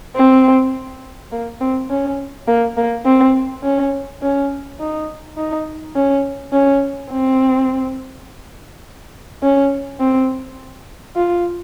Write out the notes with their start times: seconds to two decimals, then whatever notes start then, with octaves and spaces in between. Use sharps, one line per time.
0.16 C4
1.32 A#3
1.61 C4
1.90 C#4
2.47 A#3
2.77 A#3
3.05 C4
3.64 C#4
4.22 C#4
4.80 D#4
5.37 D#4
5.96 C#4
6.53 C#4
7.11 C4
9.43 C#4
10.00 C4
11.16 F4